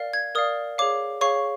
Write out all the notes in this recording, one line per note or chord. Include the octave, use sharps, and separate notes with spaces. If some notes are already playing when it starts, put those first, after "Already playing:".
Already playing: A#4 D5 F5
G#6
A#4 D5 F5 D#6
G#4 C#5 F5 D6
G#4 C#5 F5 C#6